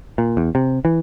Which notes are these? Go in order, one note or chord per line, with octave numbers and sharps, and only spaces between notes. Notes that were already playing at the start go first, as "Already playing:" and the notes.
A#2
E2
C3
E3